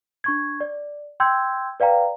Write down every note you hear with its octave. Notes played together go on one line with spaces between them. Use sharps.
D4 C#6 G#6
D5
G5 C6 E6 G6 G#6
B4 D5 F5 G5 A#5